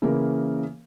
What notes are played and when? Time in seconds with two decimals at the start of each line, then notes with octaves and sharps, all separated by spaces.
0.02 C#3 E3 A#3 A#4